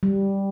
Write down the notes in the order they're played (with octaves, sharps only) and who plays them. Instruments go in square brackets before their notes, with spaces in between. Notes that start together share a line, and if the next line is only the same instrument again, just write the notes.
[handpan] G3